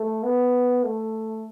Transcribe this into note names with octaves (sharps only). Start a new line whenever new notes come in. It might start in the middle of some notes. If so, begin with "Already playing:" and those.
Already playing: A3
B3
A3